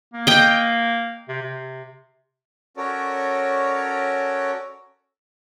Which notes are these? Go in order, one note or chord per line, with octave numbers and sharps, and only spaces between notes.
A#3
D#5 G5
C3
C3
C#4 F#4 A4 A#4 C#5 D5